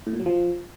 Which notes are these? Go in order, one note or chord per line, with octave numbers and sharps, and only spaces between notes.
A2
A#2
F#3
F3